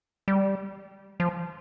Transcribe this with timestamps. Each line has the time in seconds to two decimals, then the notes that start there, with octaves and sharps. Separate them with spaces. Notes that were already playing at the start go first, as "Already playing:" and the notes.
0.28 G3
1.20 F3